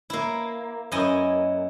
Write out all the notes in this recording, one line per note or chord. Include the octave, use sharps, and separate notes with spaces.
A#3 E4
F#2 E4 D#5 G#5